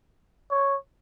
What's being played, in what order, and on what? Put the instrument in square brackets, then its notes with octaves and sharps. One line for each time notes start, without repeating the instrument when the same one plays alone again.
[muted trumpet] C#5